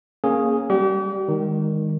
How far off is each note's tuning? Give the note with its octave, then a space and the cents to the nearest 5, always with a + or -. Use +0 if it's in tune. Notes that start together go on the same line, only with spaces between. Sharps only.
A#3 +0 C#4 -25 G#4 +0
G3 +0 G4 -40
D#3 +0 G#3 -30